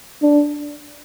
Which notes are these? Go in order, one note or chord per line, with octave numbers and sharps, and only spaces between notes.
D4